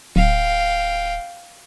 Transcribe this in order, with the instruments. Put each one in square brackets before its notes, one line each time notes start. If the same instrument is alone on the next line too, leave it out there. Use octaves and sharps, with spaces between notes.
[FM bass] D1 [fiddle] F5 G5